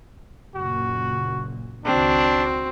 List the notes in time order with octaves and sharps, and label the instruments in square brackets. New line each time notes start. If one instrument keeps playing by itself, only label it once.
[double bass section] F#1 A#2 [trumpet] F#4
[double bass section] C#2 D#3 [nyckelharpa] C4 F#4 [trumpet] D4